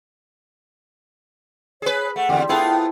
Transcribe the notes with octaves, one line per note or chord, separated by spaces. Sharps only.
G#4 B4 C#5
A3 F#5
E2 D3 G4 C5
B3 E4 F4 G#4 A4 G5